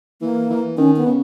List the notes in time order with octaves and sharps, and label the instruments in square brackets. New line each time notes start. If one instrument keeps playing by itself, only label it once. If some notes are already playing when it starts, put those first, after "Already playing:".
[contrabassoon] E3 [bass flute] A#3
[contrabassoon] E3
[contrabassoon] D#3 [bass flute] C#4
[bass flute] B3
[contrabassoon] C#3